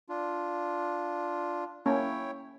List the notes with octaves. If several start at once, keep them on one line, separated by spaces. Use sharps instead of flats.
D4 F4
A#3 C#4 E4 C#5 G5